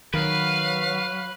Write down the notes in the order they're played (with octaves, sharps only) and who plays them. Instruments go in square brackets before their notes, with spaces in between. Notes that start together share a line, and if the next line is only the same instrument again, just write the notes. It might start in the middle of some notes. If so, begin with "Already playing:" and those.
[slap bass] D#3 [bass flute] F#3 [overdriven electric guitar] B4 [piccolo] F5